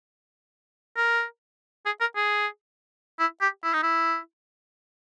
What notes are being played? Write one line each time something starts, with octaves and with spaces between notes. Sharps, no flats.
A#4
G#4
A#4
G#4
E4
G4
E4
D#4
E4